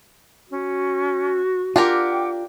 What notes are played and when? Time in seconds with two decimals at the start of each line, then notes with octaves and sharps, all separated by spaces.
0.49 C#4 F#4
1.76 D4 F4 G4 A#4 F#5 G5 D6